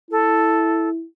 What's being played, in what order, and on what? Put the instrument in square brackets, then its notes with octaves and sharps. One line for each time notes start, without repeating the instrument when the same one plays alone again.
[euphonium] E4 [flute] A4